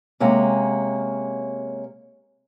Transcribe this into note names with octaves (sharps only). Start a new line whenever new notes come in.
C3 G#3 A#3 C#4